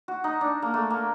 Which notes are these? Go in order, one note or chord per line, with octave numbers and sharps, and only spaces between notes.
F#4
D#4
D4
A#3
A3
A#3